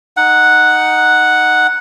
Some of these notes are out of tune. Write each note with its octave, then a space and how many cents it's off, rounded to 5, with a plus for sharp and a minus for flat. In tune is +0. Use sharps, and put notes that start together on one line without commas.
D#4 +0 F#5 +0